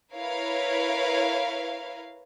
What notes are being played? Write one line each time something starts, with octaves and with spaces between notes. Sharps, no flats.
E4 A#4 B4 C#5 F5